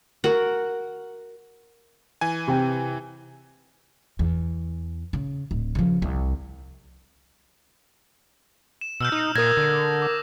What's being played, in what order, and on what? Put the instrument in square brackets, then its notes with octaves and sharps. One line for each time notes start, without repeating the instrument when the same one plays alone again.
[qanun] F#4 A#4 F#5
[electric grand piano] E3 G#5
[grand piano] C3 G5
[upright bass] E2
C#3
D1
C#3 F3
C2
[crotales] E7
[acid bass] B2 [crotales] E6 F6 G6
[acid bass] D#4 [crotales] D#6
[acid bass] A#2 [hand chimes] A#4 G#6 [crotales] D#6 A#6
[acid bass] D3
[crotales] D6